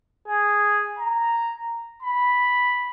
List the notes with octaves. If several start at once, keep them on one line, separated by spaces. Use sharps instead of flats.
G#4
A#5
B5